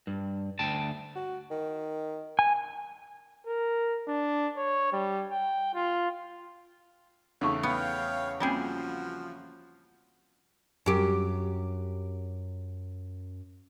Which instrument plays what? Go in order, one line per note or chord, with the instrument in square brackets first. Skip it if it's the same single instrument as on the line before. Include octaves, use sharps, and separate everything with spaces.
[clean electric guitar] G2
D2 G5 A5
[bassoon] F#4
D#3
[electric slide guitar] G#5
[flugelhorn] A#4
D4
C#5
G3
G5
F4
[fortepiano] E2 C#3 A3 [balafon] D#4 E4 C#6
[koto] B3 [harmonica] C#5 F5 G5
[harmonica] F3 F#4 [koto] G3 E4 G#4 [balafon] A#3 C4 C#4
[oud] F#2 G4